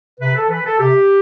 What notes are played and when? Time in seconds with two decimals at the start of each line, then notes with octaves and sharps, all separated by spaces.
0.20 C3 B4
0.36 A4
0.50 E3 B4
0.65 A4
0.79 C3 G4